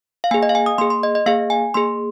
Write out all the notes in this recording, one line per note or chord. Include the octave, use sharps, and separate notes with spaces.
F5
A#3 G#4 G#5
D#5
F5
G#5
D#6
A#3 G#4 C6
C6
D#5
D#5
A#3 G#4 F5
G#5
A#3 G#4 C6